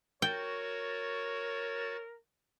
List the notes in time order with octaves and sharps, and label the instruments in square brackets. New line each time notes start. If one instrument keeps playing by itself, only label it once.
[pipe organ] F#4 A6 [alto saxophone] A#4 [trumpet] C#5 [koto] G5